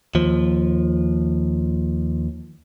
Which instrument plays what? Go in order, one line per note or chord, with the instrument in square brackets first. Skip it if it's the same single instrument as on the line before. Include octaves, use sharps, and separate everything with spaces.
[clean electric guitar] D#2 F3